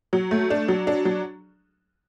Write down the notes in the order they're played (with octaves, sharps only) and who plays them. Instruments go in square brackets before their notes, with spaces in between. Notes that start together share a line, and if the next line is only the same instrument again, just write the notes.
[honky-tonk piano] F#3
A3
D4
F#3
D4
F#3